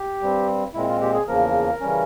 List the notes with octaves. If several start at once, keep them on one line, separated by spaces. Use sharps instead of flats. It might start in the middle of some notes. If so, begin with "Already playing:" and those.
Already playing: G4
G2 G3 C4
A#2 G#3 C4 E4
F4
G4
G#4
E2 C#3 F3 A#3 A#4
C#3 E3 G3 C#4